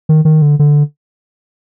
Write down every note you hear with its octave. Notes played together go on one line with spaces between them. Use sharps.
D#3
D#3
D3
D3